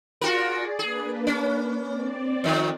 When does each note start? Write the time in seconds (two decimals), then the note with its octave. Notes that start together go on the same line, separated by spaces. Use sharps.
0.21 F4 F#4 G#4 A#4 D5
0.79 A#3 D4 G#4 B4
1.27 C#4
1.80 C4 D5
2.44 F2 D#3